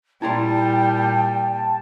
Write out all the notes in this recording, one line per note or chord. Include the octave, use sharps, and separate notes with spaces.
A#2 G3 E4 G5 A5 A#5 C6